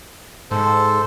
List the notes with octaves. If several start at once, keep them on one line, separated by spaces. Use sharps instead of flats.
G#2 A4 C5